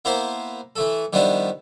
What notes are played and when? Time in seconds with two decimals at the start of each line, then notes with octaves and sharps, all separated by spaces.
0.05 A#3 B3 E4 A#4 C5
0.76 E3 A3 A4
1.13 D#3 F3 G3 B3 D4 E4